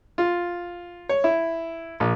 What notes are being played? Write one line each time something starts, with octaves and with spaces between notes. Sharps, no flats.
F4
C#5
E4
A#1